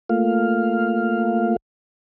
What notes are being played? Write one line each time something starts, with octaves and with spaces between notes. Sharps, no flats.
A3 A#3 F4 F5